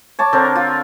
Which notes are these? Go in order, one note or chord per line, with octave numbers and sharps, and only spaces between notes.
C#5 A5 D6
D3 C4 D4 A#4
F4